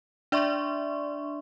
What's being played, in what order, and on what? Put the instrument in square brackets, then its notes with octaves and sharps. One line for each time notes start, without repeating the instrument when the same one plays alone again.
[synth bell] D4 D5 E5 C6 C#6